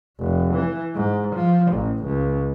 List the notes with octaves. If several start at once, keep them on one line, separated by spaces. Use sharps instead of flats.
F1
E3
G#2
F3
A1
C#2